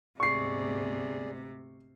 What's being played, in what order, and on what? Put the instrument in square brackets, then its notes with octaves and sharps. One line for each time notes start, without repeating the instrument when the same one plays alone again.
[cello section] D2 G#2 B3 [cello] C3 [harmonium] G#4 D5 [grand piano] C#6 C7